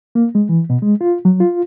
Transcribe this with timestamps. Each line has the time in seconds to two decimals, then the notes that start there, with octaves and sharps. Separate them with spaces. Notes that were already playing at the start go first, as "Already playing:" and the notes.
0.15 A#3
0.35 G#3
0.49 E3
0.70 B2
0.82 G#3
1.01 F4
1.25 F#3
1.40 F4